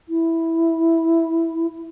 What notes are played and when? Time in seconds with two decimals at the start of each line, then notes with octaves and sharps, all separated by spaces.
0.09 E4